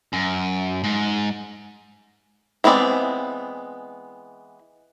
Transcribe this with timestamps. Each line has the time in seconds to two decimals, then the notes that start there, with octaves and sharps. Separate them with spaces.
0.13 F#2
0.84 G#2
2.64 E3 G#3 B3 C4 D5